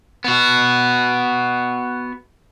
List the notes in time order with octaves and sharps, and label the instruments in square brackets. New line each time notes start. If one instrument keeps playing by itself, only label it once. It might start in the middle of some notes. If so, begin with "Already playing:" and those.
[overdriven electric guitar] B3 F#4